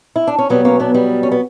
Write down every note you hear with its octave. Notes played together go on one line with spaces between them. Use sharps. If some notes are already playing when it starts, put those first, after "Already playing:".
E4
D4
C#4
B2 F#3 G3 B3
A#3 C#4
B3 D4
G3 B3
C#4
B3